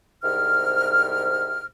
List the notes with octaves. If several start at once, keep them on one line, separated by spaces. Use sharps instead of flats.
C2 G#2 C3 F6